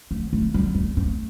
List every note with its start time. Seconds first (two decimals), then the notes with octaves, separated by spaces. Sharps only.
0.11 A3
0.33 A3
0.54 G3
0.75 A3
0.97 A3